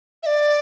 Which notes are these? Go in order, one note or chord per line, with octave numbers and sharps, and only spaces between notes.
E5
D5